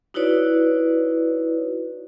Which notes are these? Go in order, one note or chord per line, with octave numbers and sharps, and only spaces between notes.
D#4 E4 F#4 B4 C#5 D5